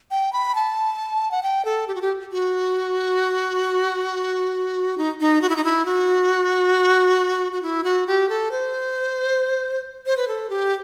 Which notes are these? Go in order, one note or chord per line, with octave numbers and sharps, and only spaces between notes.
G5
B5
A5
F#5
G5
A4
G4
F#4
G4
F#4
D#4
D#4
F#4
E4
D#4
E4
F#4
F#4
E4
F#4
G4
A4
C5
C5
B4
A4
G4